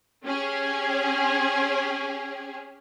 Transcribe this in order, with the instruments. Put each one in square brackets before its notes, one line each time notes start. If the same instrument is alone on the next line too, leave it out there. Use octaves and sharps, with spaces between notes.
[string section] C#4 G4 G#4